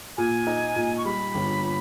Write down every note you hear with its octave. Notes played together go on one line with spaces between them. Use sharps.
A#2 G#5
D#4
A#2
C#6
G3 B5
G1